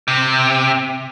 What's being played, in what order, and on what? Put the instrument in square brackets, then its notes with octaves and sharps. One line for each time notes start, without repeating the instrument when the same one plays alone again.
[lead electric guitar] C3